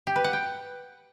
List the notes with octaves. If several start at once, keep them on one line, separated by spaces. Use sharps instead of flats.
G4
B4
F#5
G5